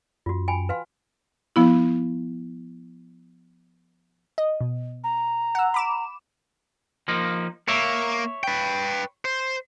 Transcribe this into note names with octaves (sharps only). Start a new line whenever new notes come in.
F#2 F4 F#4
G5 G#5 B5
B4 F5 C6
F3 B3 E4
D#5
B2
A#5
F#5 E6
B5 D6 E7
F3 A#3 D#4
A#3 C#5 E5
B4 G5
C5